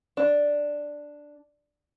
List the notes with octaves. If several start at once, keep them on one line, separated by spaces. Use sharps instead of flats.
D4